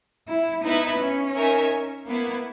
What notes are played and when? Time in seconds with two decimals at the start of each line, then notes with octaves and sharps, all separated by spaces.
0.28 E4
0.64 B3 D#4 E4 B4 E5
0.99 C#4
1.35 D#4 A#4 E5 G#5
2.07 A#3 B3 E4 B4